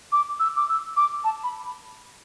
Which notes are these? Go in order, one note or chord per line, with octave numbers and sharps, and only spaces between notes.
D6
E6
D6
E6
D6
A5
B5